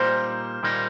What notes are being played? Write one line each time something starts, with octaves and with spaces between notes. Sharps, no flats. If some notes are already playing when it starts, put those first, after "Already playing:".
Already playing: A#2 G3 A#3 D#4 C5
A#2 G3 A#3 D#4